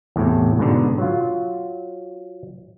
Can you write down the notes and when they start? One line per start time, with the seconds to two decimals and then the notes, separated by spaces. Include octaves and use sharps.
0.16 E2 A2 C3
0.59 G#2 B2 D3
0.98 F#3 F4